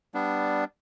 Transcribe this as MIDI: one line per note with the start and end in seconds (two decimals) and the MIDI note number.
0.14 0.64 55
0.14 0.64 59
0.14 0.64 62